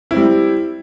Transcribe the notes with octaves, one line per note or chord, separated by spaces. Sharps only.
G3 C4 E4